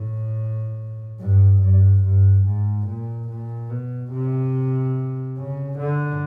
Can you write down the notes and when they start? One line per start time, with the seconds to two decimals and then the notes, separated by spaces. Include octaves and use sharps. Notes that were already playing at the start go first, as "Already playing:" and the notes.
Already playing: A2
1.20 G2
1.62 G2
2.03 G2
2.46 G#2
2.87 A#2
3.29 A#2
3.70 B2
4.12 C3
5.37 C#3
5.79 D3